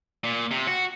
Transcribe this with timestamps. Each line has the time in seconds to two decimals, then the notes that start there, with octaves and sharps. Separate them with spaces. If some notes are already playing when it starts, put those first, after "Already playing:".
0.24 A#2
0.51 C3
0.68 F#4